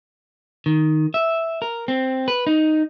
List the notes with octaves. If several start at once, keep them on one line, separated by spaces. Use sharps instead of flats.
D#3
E5
A#4
C4
B4
D#4